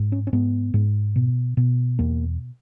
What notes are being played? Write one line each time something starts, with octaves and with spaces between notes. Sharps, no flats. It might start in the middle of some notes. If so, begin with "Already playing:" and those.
Already playing: G#2
C#4
C#4
G#2 B3
G#2
B2
B2
E2 A#3